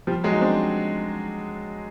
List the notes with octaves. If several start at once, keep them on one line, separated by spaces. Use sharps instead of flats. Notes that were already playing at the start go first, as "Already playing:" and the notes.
F3 G3
F#3 G#3
D#4
C4 D4